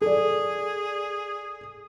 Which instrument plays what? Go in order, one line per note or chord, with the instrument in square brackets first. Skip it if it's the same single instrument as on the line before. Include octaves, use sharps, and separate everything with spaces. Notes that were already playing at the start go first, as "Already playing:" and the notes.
[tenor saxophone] G#4 [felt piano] A4 D5